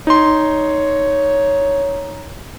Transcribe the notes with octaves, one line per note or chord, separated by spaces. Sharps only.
D#4 C#5 C6